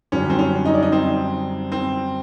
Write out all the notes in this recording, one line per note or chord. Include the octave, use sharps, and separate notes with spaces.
F#2 D3 G3 C#4
C4
C#4
D#4
D4
D#4
C4
C4